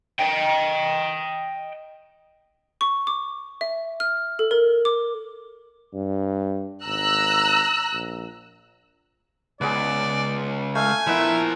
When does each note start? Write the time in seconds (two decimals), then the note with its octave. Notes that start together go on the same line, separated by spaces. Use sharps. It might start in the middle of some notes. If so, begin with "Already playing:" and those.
0.19 D#5 G5
2.81 C#6
3.07 D6
3.61 E5
4.00 F6
4.39 A4
4.51 A#4
4.85 D6
5.94 G2
6.85 G#1 A#5 E6 F#6
7.93 A#1
9.61 C#2 B3 G#4 D5
10.75 A3 F5 G#5
11.07 F3 B3 E4 A#4 E5